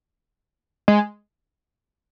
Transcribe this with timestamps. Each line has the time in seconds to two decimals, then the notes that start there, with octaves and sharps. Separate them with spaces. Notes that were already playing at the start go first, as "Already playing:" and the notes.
0.88 G#3